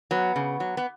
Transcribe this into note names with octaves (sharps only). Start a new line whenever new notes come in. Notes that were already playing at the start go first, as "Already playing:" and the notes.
F#3 B3
C#3
F#3
B3